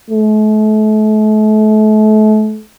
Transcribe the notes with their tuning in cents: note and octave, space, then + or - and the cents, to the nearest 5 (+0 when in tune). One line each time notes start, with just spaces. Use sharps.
A3 -35